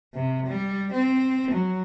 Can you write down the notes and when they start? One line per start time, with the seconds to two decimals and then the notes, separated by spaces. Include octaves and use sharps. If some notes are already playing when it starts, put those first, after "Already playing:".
0.15 C3
0.46 G3
0.93 C4
1.51 F#3